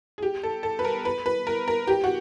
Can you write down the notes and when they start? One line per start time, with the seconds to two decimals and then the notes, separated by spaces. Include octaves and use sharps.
0.18 G#4
0.22 G4
0.43 A4
0.63 A4
0.79 B4
0.85 A#4
1.05 B4
1.26 B4
1.47 A#4
1.68 A#4
1.87 G4
2.04 F#4